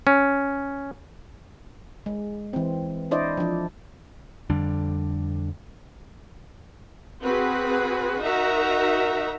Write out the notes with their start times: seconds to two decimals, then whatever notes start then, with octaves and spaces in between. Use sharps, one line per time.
0.07 C#4
2.06 G#3
2.53 E3 C4
3.11 D4 E4 C5 D5 D#5
3.37 F3 D4
4.50 F2 D3 G3 D4
7.23 C4 F#4 G#4 B4
8.22 D#4 F#4 A#4 E5 A#5